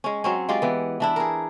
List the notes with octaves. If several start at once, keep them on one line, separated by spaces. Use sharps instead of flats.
G#3 C#4
F#3 C4 C#4
G#3 F4 G4 D5
E3 B3
E3 D4 E4
G#4 A#4